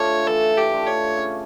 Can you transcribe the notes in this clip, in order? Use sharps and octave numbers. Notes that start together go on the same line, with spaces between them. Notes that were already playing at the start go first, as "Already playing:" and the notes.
Already playing: A3 D4 F4 C#5
E3 A4
G4
A3 D4 F4
C#5
C#3